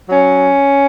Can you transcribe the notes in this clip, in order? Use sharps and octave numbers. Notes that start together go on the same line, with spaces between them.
F#3 C#4